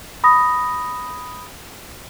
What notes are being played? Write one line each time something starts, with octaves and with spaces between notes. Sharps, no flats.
B5 D#6 A#6